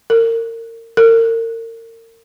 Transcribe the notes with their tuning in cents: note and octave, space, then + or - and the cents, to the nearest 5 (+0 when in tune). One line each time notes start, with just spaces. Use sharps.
A#4 -30
A#4 -35